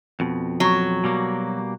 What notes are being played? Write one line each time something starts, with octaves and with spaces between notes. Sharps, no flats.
F2 B2
F#3
B2 G3 A#3